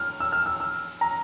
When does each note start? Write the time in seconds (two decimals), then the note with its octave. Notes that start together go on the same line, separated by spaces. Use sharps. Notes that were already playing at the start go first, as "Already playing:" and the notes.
Already playing: F6
0.20 E6
0.32 F6
0.46 E6
0.60 E6
1.01 A#5